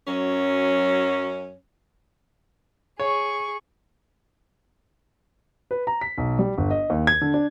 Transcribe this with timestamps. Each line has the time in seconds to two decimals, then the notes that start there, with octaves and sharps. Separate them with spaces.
0.08 F#2 F#3 C#4
3.00 G#4 C#5 C#6
5.71 B4
5.87 A#5
6.01 B6
6.18 B1
6.39 G3
6.58 G1
6.71 D#5
6.90 D#2
7.07 G#6
7.21 D3
7.34 D4